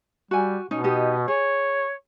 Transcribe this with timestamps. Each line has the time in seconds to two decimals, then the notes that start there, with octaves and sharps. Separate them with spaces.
0.31 G3 F#4 G#5
0.71 B2 C#4 D#4
0.84 D#4 G4 D#5
1.28 G#4 C#5